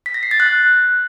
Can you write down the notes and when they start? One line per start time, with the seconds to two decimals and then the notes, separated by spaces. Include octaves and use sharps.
0.06 B6
0.14 A#6
0.23 C7
0.31 A6
0.40 F#6